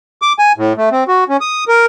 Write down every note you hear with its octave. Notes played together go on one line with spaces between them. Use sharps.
D6
G#5
A2
A3
C4
F#4
C#4
D#6
A#4